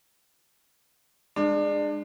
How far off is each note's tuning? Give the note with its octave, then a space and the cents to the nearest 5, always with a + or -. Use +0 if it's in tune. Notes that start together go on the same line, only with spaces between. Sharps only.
G#3 -10 D4 +25